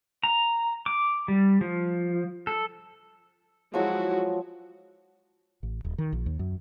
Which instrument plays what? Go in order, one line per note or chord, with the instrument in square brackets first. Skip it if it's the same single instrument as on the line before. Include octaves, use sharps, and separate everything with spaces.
[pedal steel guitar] A#5
D6
G3
F3
A4
[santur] F3 F#3 [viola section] G#3 E4 F#4
[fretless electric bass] A1
D#1
D#3
A#1
D#2
F#2